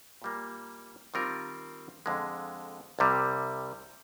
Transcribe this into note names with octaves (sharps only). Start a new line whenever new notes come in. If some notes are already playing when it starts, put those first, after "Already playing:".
A#2 G3 A#3
D#3 G3 C4 F4 A#4
F2 D3 G#3
C2 C3 G3